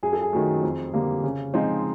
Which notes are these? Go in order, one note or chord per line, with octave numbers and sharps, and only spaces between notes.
F#2 G#4
A4
G#4
D#3 F#3 A3
F2
D3 G3 A#3
C#3
F3 G#3 C4 D#4